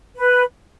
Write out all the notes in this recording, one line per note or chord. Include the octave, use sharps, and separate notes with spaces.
B4